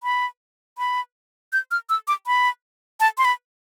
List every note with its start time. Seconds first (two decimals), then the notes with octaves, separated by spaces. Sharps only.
0.03 B5
0.78 B5
1.53 G6
1.71 F6
1.89 E6
2.08 D6
2.27 B5
3.00 A5
3.18 C6
3.25 B5